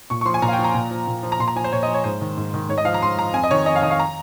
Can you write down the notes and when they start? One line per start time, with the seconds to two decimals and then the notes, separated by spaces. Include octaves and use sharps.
0.10 A#2 C#6
0.21 C#6
0.25 F3 C6
0.34 G#5
0.42 A#2 A#5
0.48 F5
0.53 G5
0.59 F3
0.64 A#5
0.74 A#2
0.91 F3
1.07 A#2
1.23 F3
1.32 A#5
1.39 A#2 C6
1.48 A#5
1.56 F3 G#5
1.64 C5
1.72 A#2 C#5
1.83 D#5
1.88 F3
1.94 C#5
2.04 G#2 C5
2.21 D#3
2.37 G#2
2.54 D#3
2.69 G#2 C#5
2.78 D#5
2.85 F3 F5
2.94 A#5
3.01 G#2 C6
3.18 F3 A#5
3.34 F2 G#5
3.44 D#5
3.51 D#3 C#5
3.66 F2 D#5
3.75 F5
3.83 D#3 D#5
3.91 F5
3.99 A#5